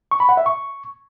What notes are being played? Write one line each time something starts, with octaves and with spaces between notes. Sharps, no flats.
C#6
B5
F#5
E5
C#6